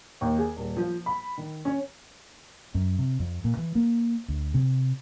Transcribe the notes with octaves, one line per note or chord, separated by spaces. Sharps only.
D#2
G#4
D#1
F3
B5
D#3
C#4
F#2
C3
F2
A#2
E3
A#3
D2
C3